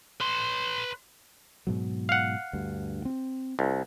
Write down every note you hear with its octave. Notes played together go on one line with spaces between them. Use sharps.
B4 C6
G#2 B2 F#3
F5 F#5
D2 G2
C4
C2